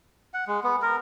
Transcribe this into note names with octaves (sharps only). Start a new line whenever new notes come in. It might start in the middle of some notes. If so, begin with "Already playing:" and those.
F#5
G#3
B3
A#4